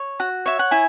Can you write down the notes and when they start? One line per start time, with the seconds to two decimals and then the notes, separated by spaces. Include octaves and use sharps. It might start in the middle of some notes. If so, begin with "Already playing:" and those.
Already playing: C#5
0.20 F#4
0.46 C#5 E5
0.59 F#5
0.71 E4 G#5